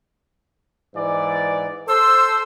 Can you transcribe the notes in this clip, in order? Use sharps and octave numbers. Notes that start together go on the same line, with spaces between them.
G#2 E3 D5
A4 C5 E6